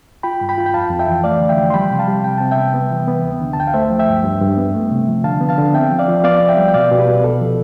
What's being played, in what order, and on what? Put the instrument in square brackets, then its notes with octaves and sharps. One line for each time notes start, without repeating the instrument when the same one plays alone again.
[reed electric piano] F4 G5 B5
G2
G5 B5
F4
G5
F2 F5 A5
F2
E5 G5
E3
A3 D5 F5
D3
E5 G5
F3
C6
G3 G5 B5
C3
F5 A5
G3
C3 G5
C3 A5
E5 G5
B3
B3
E3
B3
D2
D3
A5
D2 G5
F5
A3 C5 E5
F3
E5 G5
G2
G2
G2
B3
A3
C3
F3
D3 F5 A5
B3
F5 A5
D3
C4 E5 G5
F3
D5 F5
F3
B3 D5 F5
C2
E5 G5
G3
G5
B2 D5 F5
B2
G4 B4
B2
C2 A4
F3